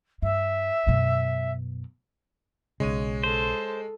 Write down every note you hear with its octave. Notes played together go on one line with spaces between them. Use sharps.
G2 E5
F#2 B2
B1 C#3 G#3 C#5 D#7
A4 C5